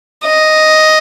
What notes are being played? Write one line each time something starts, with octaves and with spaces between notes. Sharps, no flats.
D#5